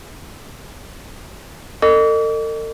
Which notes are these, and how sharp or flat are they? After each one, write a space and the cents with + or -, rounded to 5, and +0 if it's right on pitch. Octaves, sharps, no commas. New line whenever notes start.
A4 +45 D#5 -30 D6 -45